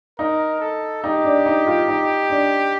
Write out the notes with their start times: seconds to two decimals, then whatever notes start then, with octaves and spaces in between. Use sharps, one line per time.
0.19 D#4 A#4
0.61 A4
1.04 D#4 G4
1.25 D4
1.46 D#4
1.67 F4
1.88 D#4
2.30 D4